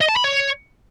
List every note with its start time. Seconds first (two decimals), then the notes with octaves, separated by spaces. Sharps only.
0.01 D#5
0.09 A5
0.16 B5
0.24 C#5